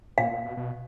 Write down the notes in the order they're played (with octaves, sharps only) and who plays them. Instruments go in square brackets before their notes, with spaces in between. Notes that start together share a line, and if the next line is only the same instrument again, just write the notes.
[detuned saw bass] A#2 [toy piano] F5
[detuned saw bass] A#2
B2
B2